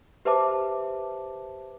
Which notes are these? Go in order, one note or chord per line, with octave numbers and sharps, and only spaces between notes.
G4 B4 C5 E5 A5 D6